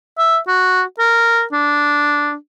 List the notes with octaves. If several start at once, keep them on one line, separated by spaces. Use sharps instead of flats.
E5
F#4
A#4
D4